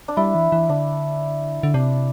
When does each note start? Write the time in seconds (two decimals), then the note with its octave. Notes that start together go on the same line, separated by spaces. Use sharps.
0.08 D4
0.17 G3 E4
0.35 E3
0.52 E3
0.69 D3 D4
1.63 D3
1.74 C3 D4